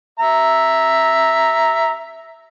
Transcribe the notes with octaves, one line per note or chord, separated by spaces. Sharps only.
E5 A#5